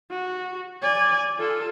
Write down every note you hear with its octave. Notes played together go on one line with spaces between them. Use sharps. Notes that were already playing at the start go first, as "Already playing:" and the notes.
F#4
D5 G#5
F4 A4